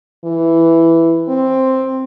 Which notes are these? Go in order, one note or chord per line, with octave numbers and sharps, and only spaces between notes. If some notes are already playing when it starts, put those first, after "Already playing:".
E3
C4